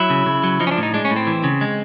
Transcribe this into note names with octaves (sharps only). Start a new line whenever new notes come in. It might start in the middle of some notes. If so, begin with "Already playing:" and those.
Already playing: F#3 E4
C#3
C#3
F#3
F3 D#4
C#4
D4
A2
D#4
G#3 D4
C#4
A2
C4
E3
C#3
G#3